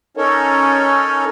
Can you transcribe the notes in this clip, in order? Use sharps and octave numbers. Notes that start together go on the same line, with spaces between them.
C#4 D#4 A4 A#4 C#5